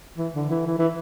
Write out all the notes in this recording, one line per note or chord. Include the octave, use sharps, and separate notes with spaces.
E3
D3
E3
E3
E3